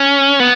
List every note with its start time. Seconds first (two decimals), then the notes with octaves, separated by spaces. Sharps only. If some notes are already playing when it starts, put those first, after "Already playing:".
Already playing: C#4
0.40 B3